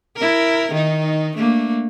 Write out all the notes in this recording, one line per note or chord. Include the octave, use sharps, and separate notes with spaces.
E4 A#4
D#3 D#4
A3 A#3 D4